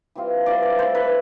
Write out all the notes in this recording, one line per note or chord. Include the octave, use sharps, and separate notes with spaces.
E3 G3 C4 F4
E3 G3 C4 F4 D5
D5
E3 A3 E4 C5
B4